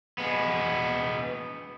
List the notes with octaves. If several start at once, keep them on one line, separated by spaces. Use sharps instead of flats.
G#3 B3